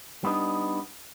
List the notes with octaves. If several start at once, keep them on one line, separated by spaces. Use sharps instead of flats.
G3 B3 D4 D#4